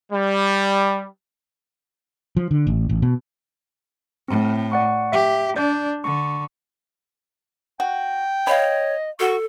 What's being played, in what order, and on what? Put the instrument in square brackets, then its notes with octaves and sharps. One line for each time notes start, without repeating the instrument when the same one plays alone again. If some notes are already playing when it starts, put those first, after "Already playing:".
[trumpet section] G3
[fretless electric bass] F3
D3
A1
A1
B2
[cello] A2 [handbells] C4
[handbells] D5 F#5 C#6
[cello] G4 [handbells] E5
[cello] D4 [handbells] D5 G6
[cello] D3 [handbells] C#6
[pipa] F#4 [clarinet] G5
[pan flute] C#5 [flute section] D#5 [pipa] F5 B5
[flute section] F#4 C#6 [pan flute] A4